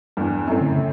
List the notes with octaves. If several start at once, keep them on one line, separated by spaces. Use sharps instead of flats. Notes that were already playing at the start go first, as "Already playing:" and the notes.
E2 G2
G3
F#2 A2 C4
D3
C#3